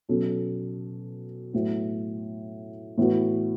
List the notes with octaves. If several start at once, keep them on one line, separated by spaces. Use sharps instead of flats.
B2 F#3 C#4 A4
A2 F#3 B3 F#4
A2 E3 B3 F#4